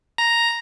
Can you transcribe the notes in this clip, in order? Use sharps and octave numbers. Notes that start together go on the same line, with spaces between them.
A#5